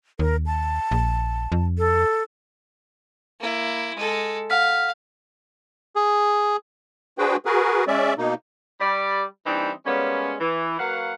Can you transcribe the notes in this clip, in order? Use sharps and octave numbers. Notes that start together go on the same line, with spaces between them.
D#2 A#4
A5
A#1
F2
A4
A#3 E4
G#3 A4
F5 F#5 F6 B6
G#4
D4 F#4 G#4 B4 C5 G5
F#4 G#4 A#4 B4
G#3 C#4 D5 E5
B2 A#3 D#4
G3 D5
E3 G3 C4 D4 D#4
G3 G#3 A#3 B3 C#4
E3
F#3 A#3 F#4 B4 F5 F#5